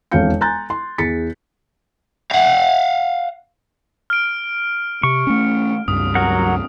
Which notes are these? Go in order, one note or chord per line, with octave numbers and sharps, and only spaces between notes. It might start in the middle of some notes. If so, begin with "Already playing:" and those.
E1 F2 E4 F5 G6 C#7
G#5 A#5 C6 F#6 G6 A6
C6
E2 G#4 A6 B6 C#7
F5 F#5
F6 D7
C3 C#6
A3 C#4
C#2 G2 D#6
F#3 A#4 F#5